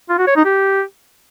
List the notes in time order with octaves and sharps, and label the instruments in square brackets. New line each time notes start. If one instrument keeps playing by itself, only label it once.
[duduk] F4
F#4
C#5
D#4
G4